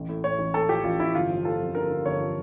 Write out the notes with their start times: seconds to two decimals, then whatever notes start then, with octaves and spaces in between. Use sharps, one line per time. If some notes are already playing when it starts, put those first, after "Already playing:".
Already playing: A1
0.09 A2
0.24 A2 C#5
0.39 A1
0.54 A2 A4
0.69 F3 G4
0.84 A1 F4
1.00 A1 E4
1.14 G1 F4
1.30 F3
1.45 F3 A4
1.60 F2
1.75 D3 A#4
1.90 D3
2.05 G1 C#5
2.21 F3